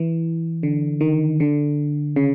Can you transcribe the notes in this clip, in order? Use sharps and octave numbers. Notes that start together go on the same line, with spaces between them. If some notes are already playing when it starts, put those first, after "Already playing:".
Already playing: E3
D3
D#3
D3
C#3